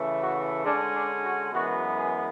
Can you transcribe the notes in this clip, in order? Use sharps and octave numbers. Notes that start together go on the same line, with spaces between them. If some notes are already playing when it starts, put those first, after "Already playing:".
Already playing: C#3 E3 A3
F#4
D3 G#3 C#4 D4
D4
F#4
F#2 E3 G#3 B3 F#4
G#4